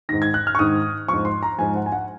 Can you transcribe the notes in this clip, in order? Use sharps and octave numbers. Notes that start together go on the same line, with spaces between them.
G#2 D#3 A#6
G#6
F#6
F6
C#6
G#2 D#3 D#6
G#2 F3 C#6
C6
A#5
G#2 F3 G#5
F#5
G#5
F#5